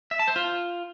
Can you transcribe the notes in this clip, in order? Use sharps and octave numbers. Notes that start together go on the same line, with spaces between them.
E5
A5
C5
F4